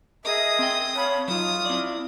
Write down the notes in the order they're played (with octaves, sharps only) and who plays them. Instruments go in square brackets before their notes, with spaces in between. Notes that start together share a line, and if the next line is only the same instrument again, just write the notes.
[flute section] G#4 A#4 D#5 [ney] E5 [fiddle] D#6
[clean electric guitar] C4 G5
[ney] C#5 [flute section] F5 A5 B5
[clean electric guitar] F#3 [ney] D#4 [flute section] F4 [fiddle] D#6
[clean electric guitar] C4 D5 [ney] E4